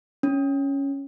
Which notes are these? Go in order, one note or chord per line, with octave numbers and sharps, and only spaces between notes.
C#4